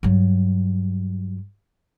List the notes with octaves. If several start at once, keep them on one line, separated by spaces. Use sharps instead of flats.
G2 F#3